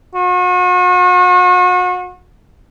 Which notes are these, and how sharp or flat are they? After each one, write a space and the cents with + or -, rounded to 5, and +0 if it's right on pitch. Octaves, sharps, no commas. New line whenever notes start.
F#4 -40